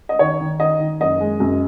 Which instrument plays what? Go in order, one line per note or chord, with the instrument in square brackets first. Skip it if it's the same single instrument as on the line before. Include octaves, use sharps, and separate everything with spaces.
[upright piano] D#5
D#3 C#5
D#3
D#3 D#5
D#3
F#1 D#5
G#3
F#2